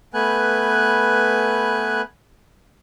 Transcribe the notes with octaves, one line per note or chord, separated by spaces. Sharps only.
A3 B3 B4 G#5 F#6